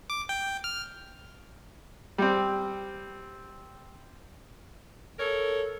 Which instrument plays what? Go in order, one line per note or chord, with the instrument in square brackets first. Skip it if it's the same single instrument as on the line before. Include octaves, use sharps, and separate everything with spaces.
[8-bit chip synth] D6
G5
F6
[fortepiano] G3 C4
[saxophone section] A4 A#4 C#5